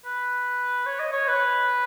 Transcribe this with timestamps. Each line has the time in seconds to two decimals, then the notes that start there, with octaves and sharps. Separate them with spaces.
0.05 B4
0.86 C#5
0.99 D#5
1.12 C#5
1.27 B4